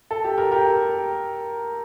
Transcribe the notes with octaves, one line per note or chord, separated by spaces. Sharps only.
A4
G4
G4 A#4
G4 A#4